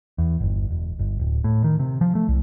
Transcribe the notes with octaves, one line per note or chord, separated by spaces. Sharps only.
E2
G1
E1
G1
D1
A2
D#3
C3
F3
A3
C2